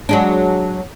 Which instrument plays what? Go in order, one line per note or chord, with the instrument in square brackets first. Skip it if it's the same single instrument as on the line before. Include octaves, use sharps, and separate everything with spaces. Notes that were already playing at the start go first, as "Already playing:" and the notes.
[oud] F#3 G#3 D4